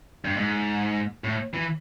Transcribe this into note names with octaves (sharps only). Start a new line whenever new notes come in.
G2
G#2
A2
E3